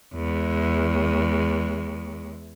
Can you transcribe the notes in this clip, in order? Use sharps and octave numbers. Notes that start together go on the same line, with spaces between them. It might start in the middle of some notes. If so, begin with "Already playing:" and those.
E2 G#3